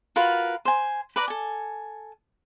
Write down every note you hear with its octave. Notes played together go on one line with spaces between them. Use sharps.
F4 F#4 A#4 B4
C5 G#5
B4 D5 A#5
A4 G#5